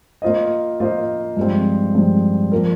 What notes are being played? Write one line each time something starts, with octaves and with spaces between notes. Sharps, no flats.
A#3 F4 C5 D#5
A#3 F4 C5 D#5
G2 F3 G#3 C4
G2 F3 G#3 C4
F3 A#3 F4 A#4